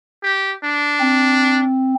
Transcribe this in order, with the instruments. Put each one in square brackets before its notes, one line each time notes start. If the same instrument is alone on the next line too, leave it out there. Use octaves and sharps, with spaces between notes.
[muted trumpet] G4
D4
[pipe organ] C4